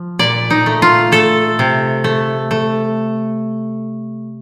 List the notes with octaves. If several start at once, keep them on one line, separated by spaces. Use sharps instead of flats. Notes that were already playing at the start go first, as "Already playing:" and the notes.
Already playing: F3
A#2 D5
D#4
A3
F4
A3 A4
C3
A3
A3